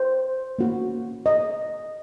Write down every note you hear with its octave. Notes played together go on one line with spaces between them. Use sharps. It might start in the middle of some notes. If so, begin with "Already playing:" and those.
Already playing: C5
A#3 C#4 F#4
D#5